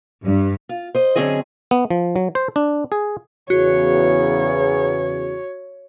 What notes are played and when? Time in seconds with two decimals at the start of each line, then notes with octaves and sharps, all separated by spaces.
0.24 G2
0.69 F4
0.94 C5 D#5
1.16 F#2 D3 C4 C#4 G#4 D#5
1.71 B3
1.91 F3
2.16 F#3
2.35 C5
2.56 D4
2.92 G#4
3.50 E2 C#3 F#4 C#5